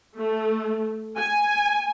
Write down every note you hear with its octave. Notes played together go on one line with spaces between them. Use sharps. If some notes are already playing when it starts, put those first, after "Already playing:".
A3
G#5